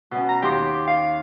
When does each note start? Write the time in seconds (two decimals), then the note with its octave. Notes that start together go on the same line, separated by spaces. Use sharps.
0.11 B2 C#4
0.29 A#5
0.42 D#2 G4 C6 D6
0.87 F5